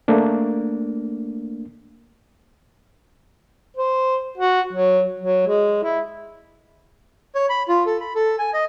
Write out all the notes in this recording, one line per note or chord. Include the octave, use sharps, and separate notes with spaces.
A3 A#3 D4
C5
F#4
F#3
F#3
G#3
E4
C#5
B5
F4
A4
B5
A4
G#5
D#5